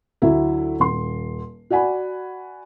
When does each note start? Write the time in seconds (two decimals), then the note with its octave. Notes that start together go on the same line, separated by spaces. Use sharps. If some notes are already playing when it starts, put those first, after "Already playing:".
0.22 D2 F#3 E4 E5
0.80 D#1 C6
1.70 F#4 D5 F#5 G#5 B5